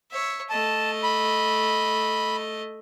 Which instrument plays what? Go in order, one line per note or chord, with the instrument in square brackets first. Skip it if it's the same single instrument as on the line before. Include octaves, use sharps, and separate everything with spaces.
[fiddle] C#5 E5
[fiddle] A3 D#5 [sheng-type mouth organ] A5
[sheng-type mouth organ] B5